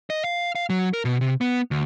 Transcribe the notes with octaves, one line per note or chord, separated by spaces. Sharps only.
D#5
F5
F5
F#3
A#4
B2
C3
B3
D2